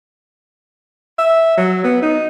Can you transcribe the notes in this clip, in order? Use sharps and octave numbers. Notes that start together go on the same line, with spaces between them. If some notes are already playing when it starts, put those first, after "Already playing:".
E5
F#3
B3
D#4